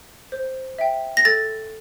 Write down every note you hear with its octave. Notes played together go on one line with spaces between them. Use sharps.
C5
E5 G5
A#6
A4 A6